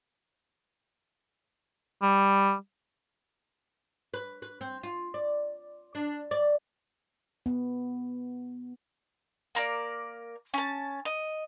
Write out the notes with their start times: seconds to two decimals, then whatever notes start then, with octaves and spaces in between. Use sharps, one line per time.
2.02 G3
4.14 B4
4.42 B4
4.61 C4
4.83 F4
5.14 D5
5.95 D4
6.31 D5
7.46 B3
9.55 A#3 A#4 D5
10.54 C#4 A5
11.05 D#5